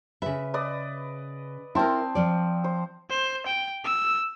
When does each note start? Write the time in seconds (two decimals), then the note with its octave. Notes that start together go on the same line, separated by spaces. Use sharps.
0.22 C#3 B4 E5
0.54 B4 D5 D#5
1.75 C4 E4 A#4 A5 C6
2.15 F3 D5
2.64 C5
3.10 C5
3.47 G5
3.84 E6